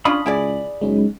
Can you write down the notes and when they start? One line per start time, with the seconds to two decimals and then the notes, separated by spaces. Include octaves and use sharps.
0.05 C#4 D4 F4 B5 D#6
0.26 C#2 E4 G#4 D5
0.81 F#1 G#3 C#4 D#4